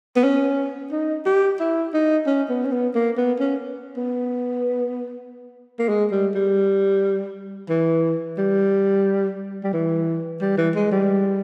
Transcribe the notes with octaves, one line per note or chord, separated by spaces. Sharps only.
B3
C#4
D#4
G4
E4
D#4
C#4
B3
C#4
B3
A#3
B3
C#4
B3
A#3
G#3
G3
G3
E3
G3
G3
E3
G3
E3
G#3
G3